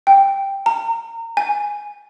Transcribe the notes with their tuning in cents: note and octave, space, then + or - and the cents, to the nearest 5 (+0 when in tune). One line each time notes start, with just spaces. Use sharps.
G5 +5
A#5 -30
G#5 -5